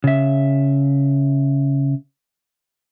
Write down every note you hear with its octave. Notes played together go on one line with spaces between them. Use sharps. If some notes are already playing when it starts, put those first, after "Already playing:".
C#3 E5